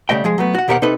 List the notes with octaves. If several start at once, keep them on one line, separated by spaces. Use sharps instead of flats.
C#3 G3 A3 D#5 G5
F3 G#3 G#4
F#3 A3 B3
F#4 F#5
D#2 B2 G4 A#4 C5 F#5
C3 D#4 A4 B4